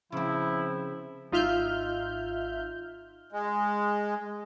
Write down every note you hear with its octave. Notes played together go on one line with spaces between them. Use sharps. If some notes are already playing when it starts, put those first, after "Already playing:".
C#3 F3 C4 E4
G#1 D#4 F4 E5 F6 G6
G#3